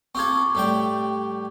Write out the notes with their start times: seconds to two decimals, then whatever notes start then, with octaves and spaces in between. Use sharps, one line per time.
0.15 C4 F4 A4 C#6 D6 G#6
0.55 A2 G3 G5